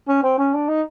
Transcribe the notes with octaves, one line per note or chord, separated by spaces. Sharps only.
C#4
C4
C#4
D4
D#4